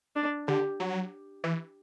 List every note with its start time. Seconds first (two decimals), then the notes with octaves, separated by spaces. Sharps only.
0.16 D4
0.48 D3 G4
0.80 F#3
1.44 E3